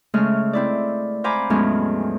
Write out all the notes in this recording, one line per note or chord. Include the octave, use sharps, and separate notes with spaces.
C#3 G#3 A3 C#4 F6
C4 E4 D5
C5 F5 G#5 A#5 B5 D6
E2 A2 F3 F#3 G#3 C#4